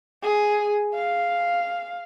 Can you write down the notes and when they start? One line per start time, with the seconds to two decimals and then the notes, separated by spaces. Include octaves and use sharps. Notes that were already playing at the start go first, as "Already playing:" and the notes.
0.23 G#4
0.94 F5